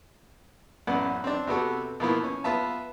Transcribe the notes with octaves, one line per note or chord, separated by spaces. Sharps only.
A1 F#2 B3 D5 F#5
C4 D4
C3 B3 F#4 A4
B2 F3 A#3 B3 E4
C#4
B3 F4 E5 A5